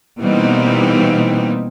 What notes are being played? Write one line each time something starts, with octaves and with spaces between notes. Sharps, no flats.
B2 E3 G3 A#3 C4 D#4